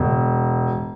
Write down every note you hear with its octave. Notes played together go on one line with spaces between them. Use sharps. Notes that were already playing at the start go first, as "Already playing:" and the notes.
Already playing: E1